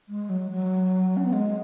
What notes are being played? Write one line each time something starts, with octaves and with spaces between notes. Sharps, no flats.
G#3
F#3
F#3
C#4
B3
G#3